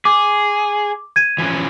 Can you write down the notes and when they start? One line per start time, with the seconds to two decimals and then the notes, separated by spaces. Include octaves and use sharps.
0.05 G#4 D6
1.16 G#6 D#7
1.38 E3 F3 C#4